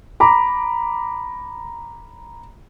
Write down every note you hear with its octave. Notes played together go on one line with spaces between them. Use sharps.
A#5 B5 D6